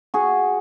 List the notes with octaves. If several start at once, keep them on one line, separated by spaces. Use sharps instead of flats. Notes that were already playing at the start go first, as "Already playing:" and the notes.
F#4 G#4